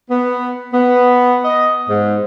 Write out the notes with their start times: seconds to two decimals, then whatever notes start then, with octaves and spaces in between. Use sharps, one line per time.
0.10 B3
0.73 B3
1.45 D#5
1.89 G#2